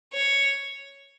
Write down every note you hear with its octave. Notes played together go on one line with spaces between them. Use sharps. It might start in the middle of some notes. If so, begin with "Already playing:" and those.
C#5